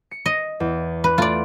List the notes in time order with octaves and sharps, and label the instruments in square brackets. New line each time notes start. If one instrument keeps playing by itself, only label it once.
[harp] C#7
[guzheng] D#5
[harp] E2
[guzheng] B4
[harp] A3 [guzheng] F4 D5